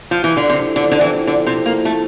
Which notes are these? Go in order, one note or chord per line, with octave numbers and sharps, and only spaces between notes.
F3
E3
D3
C3 F3 C4 E4 A4
D3
D3
E3
D3
C3
A#3
A3